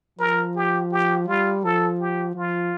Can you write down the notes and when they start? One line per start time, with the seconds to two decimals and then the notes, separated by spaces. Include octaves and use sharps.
0.19 F3 A#4
0.56 G4
0.92 G4
1.27 G3 F4
1.64 F3 A4
2.00 G4
2.35 F3 F4